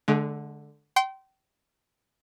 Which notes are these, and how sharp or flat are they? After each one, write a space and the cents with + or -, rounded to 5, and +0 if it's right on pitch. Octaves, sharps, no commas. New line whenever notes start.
D3 +0 G#3 +40
G5 -30 C6 +0